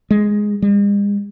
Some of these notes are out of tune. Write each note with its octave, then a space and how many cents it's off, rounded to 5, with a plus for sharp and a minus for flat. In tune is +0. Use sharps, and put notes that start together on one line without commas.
G#3 +0
G#3 -45